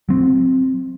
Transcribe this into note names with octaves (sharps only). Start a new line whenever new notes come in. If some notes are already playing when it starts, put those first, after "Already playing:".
F#3 C4